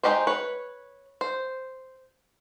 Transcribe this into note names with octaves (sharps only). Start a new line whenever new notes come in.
G#3 C#4 D#4 G4 C5
B4 C#5
C5